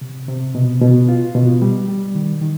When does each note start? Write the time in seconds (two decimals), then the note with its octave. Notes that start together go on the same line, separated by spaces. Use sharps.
0.01 C3
0.28 C3
0.55 B2
0.82 B2
1.09 F4
1.35 B2
1.62 G3
1.88 G3
2.15 D#3
2.41 D#3